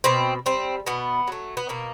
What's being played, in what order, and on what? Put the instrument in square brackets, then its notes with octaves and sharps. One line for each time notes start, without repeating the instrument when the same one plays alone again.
[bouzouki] B2 C4
G3 C4
B2 B3
F#3 A3
B3
B2 A#3